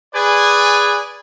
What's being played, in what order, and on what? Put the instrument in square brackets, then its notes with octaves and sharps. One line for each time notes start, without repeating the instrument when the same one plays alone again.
[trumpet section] G#4 B4 D5 G#5